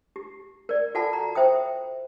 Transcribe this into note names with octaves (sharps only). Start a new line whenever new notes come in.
G4
A#4 D5
F4 F#4 A4 F#5 A5 B5
A#5
C5 E5 G5 D#6